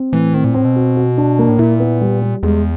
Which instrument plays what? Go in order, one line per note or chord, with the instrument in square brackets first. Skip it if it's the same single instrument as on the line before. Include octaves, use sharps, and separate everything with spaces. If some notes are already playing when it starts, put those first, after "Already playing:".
Already playing: [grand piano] C4
[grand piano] A2 [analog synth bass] E3
[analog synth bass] D#3 [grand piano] C4
[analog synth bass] A#2
[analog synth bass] A2 [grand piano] C4
[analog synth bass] B2
[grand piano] F#4
F#4
D4
A#3
[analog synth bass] A2
[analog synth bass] A#2 [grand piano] E4
[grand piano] B3
G3
G3
[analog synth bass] E2 [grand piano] G#3